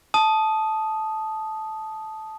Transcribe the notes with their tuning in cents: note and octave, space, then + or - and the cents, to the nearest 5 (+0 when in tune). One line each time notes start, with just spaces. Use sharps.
A5 -10 D#6 +0